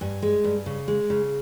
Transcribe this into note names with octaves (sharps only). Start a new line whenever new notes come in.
G2 G#5
G#3
G2
C#3
G#3
C#3